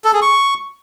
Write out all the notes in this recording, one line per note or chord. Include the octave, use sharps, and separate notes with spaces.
A4
G#4
C#6